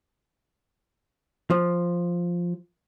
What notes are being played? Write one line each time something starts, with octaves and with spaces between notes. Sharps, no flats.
F3